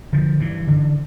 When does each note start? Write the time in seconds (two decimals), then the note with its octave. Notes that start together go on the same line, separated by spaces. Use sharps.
0.13 D3 F3
0.40 G2 E3
0.67 D3